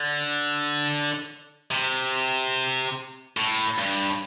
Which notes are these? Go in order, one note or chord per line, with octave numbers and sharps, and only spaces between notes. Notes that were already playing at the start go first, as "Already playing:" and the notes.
Already playing: D3
C3
A2
G2